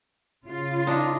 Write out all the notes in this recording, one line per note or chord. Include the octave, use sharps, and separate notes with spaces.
C#3 F4
D4 D#4